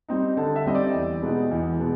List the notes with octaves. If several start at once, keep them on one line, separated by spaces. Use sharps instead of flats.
G3 C4 D#4
D3 A5
E5
G3 C4 D#4 D#5
D5
E2
B2 G#3 B3 D#4
E2
B2 G#3 B3